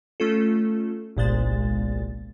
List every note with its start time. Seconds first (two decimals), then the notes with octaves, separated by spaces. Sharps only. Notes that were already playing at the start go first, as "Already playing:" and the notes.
0.20 A3 C#4 F4 A4
1.17 G1 C2 A#2 G#3 C5 A6